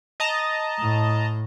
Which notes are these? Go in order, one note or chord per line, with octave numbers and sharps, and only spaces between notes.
D#5 A5 A#5
A2